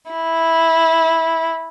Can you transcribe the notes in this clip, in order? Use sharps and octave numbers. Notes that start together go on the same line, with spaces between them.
E4